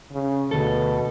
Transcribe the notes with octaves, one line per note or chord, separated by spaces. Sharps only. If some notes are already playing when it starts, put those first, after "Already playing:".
C#3
D2 B2 A4